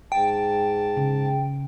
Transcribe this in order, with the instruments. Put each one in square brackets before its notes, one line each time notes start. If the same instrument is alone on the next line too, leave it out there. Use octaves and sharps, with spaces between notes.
[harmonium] G#2 A5 [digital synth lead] G5
[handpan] C#3